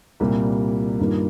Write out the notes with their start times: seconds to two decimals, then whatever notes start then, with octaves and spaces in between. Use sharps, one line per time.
0.20 C2 A#2 G3 A#3
0.99 G2 D#3 G3 A#3 F4